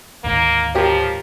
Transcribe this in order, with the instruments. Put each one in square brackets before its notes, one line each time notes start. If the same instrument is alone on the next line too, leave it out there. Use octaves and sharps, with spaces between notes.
[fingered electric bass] D2 G#2 D#3 [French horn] A#3
[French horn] F3 [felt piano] G4 A#4 C#5